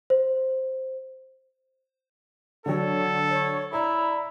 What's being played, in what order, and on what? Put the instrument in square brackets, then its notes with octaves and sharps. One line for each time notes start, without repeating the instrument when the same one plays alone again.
[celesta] C5
[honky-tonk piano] D3 F#3 [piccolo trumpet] A4 [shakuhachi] C#5
[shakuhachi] C#5
[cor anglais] E4 [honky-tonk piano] D5 [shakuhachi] A#5